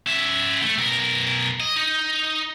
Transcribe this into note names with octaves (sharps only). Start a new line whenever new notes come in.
C#4 E5
A3
B1 A#4
D#5
D#4